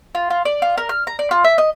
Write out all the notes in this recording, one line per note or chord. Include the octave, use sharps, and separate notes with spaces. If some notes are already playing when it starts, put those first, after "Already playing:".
F4
F4
D5
F4
A#4
F6
A#5
D5
F4
E5
D#5